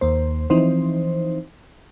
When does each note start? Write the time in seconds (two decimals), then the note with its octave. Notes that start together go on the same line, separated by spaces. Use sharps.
0.01 D#2 A#3 C5
0.50 E3 F3 C4 D#4 C5